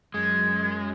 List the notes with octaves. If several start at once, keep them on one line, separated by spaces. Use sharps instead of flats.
F#2 G#3 G#6